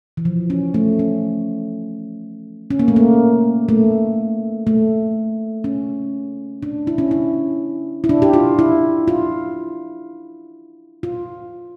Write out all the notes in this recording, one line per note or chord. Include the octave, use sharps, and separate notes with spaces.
E3
F3
C#4
A3
C#4
C#4
A#3
A3
A#3
A3
A3
C#4
D4
E4
C#4
E4
E4
D4
G4
F4
E4
F4
F4